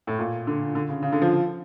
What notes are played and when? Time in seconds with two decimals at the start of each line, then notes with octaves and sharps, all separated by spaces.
0.07 A2
0.19 A#2
0.47 D3
0.75 D3
0.89 C#3
1.02 C#3
1.12 D3
1.22 F3